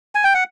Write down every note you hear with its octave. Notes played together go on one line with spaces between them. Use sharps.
G#5
G5
F#5